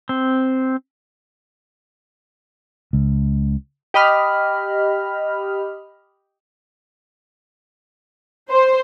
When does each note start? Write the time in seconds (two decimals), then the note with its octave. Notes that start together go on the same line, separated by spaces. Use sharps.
0.09 C4
2.93 C#2
3.94 G4 D#5 B5 F6
8.50 C5